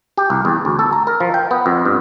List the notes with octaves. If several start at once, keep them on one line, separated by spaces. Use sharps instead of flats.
G4
C2
E2
D2
A4
A#5
A#4
F3
G5
B3
F2
G2